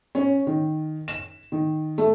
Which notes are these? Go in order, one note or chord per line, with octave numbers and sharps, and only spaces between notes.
C#4
D#3
E7
D#3
A3